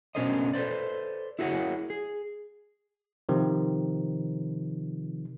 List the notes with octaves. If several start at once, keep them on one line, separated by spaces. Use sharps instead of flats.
B2 C#4 D4 A#4 C5 D#5
A4 B4 C5 D5
E4 F#4 G#4 A#4 C#5 F#5
G#4
C3 D#3 F3